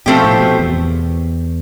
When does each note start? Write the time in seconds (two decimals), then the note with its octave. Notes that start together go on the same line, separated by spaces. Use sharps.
0.06 B2 F3 A3 C4 G4
0.24 A2
0.41 B2
0.59 E2